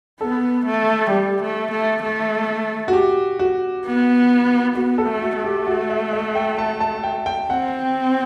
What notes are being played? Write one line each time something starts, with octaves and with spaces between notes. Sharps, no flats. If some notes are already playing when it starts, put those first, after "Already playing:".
B3 A4
A3
G3 G4
A3
A3
A3
F#4
G4
F#4
B3
B3 F#4
A4
A3
F#4
A3
G4
F#4
E5
E5
G5
A5
A5
G5
G5
C4 F#5